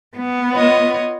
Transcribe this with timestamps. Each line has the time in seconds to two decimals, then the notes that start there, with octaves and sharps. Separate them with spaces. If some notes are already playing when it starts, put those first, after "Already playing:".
0.17 B3
0.51 F4 C#5 D#5